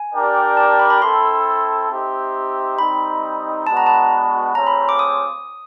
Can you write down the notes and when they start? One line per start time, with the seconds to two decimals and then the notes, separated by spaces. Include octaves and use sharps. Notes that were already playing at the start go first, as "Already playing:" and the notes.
Already playing: G#5
0.13 D4 G4 A#4 D5 G5
0.57 A5
0.79 B5
0.90 B5
1.02 C4 E4 A4 C6
1.90 C4 D#4 G4 C5 E5
2.79 G3 C4 D#4 B5
3.67 G#3 B3 D4 F#4 B4 A5
3.77 A#5
3.87 A5
4.55 A3 C4 F4 G#4 C#5 A#5
4.67 B5
4.89 D6
4.99 D#6